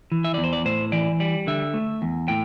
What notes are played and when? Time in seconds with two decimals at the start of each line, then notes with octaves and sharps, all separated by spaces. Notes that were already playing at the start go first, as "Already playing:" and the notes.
0.12 E3
0.25 E5
0.34 E2 D5
0.44 C5
0.53 D5
0.65 A2 C5
0.92 E3 D5
1.20 G3 D5
1.47 D3 E5
1.74 A3
2.02 E2
2.28 A2 G5